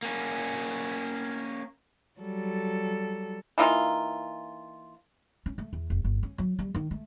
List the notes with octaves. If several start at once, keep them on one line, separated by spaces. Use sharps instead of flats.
A#3 C#4
F#3 G3 A4
E3 A#3 D#4 F4
C#4
A3
E2
F1
G1
C#4
F#3
G3
D#3
A3